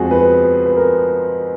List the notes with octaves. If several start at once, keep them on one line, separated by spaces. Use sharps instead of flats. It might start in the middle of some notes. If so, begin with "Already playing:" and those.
Already playing: F2 F3 G#3 F#4 G#4
B4
B4
A#4